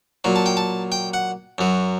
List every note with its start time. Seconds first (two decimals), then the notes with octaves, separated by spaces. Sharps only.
0.24 A#2 F#3
0.36 A5
0.46 G5
0.57 A5
0.92 G5
1.14 F#5
1.58 F#2 F#3